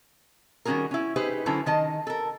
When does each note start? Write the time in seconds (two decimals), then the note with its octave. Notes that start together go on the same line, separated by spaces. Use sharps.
0.65 D#3 G3 C#4 F#4 G#4 A#4
0.91 C#4 E4
1.16 D#4 G4 G#4 B4 C5
1.46 D3 F#3 C#4 E4 A4 C5
1.66 D#3 D#5 A5
2.07 A4 A#4